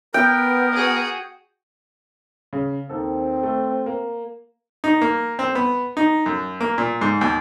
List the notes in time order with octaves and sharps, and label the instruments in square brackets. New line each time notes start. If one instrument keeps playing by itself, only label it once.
[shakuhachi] B3 [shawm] A#4 [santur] G5
[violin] F#4 G#4
[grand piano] C#3
[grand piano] D#2 A4 [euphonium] C4
[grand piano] A3
A#3
[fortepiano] D#4
A#3
C4
B3
D#4
F#2
A#3
A#2
G#2
D#2